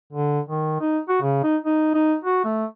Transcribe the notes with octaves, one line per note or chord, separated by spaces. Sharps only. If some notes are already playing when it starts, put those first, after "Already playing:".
D3
D#3
D#4
F#4
C#3
D#4
D#4
D#4
F#4
A3